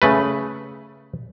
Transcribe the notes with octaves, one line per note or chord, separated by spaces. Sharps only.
C#3 A3 B4